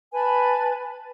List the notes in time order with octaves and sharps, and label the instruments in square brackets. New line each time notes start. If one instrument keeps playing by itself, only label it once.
[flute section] B4 G#5 A5 B5